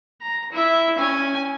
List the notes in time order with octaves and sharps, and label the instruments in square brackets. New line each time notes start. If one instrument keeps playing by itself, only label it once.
[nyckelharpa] A#5
E4 E5
C#4 G#5